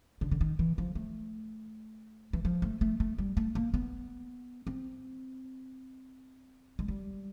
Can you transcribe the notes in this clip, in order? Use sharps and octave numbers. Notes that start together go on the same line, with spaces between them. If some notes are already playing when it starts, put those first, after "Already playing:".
D3
D3
D#3
E3
F3
A3
E3
F3
A3
A3
A3
G3
A3
A#3
B3
C4
G#3
G3